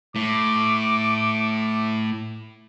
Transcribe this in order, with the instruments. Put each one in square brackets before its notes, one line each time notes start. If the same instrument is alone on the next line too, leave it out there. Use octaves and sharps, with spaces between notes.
[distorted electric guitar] A2 [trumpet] D6